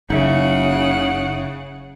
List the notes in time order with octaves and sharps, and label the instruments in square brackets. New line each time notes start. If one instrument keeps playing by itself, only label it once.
[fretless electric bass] F#1 [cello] C#3 [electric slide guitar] D#4 E5 [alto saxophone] F#5